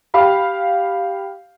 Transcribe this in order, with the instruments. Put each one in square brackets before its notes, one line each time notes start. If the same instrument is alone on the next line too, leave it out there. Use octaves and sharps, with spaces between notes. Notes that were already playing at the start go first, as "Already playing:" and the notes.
[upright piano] G4 F5 B5